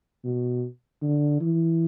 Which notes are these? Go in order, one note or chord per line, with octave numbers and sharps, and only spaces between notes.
B2
D3
E3